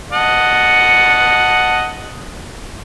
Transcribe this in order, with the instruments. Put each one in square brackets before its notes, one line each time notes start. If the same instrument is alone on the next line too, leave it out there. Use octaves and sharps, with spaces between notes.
[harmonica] D#5 F#5 A5